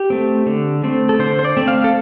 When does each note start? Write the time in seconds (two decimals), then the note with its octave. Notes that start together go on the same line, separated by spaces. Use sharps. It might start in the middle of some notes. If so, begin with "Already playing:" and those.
Already playing: G4
0.10 A3 C4
0.46 D3
0.84 A3 C4
1.09 A4
1.19 D3 C5
1.39 C5
1.45 D5
1.57 A3 C4
1.68 F5
1.84 A4